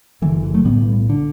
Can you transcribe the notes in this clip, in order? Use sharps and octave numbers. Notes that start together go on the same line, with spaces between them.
F#1 F#2 D3 E3
E3
E3
F#3 A3
B1 A2 G3 B3
D3